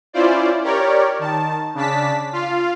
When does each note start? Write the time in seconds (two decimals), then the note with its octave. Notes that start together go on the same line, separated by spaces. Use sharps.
0.13 C#4 E4 F4 C5 D5
0.63 G4 A#4 C#5 D5
1.19 D#3 A5
1.74 C#3 D4 A5 B6
2.33 F4 F5